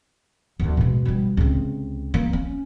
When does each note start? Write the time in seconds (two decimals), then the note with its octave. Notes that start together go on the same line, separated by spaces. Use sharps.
0.59 D2 A#3
0.77 B2 G#3
1.05 B2 G3
1.37 C#2 C3
2.14 A#3
2.33 C#4